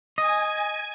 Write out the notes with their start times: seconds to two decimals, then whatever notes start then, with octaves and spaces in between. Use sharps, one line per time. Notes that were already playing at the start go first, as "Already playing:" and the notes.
0.18 D#5 G#5